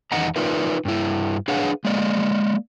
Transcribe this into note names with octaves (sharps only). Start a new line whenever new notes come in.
E2 D#3 D#5 F#5 A#5
D#4 F4 A#4 B4 D5 E5
G2 E4
D4 G#4 B4 C#5 F5 F#5
G#3 A#3 D5 D#5